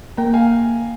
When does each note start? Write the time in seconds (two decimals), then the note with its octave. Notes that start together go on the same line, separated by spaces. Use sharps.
0.17 A#3 G5 A#5
0.33 F5 G#5